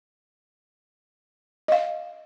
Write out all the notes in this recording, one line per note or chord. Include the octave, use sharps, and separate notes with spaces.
D#5 F5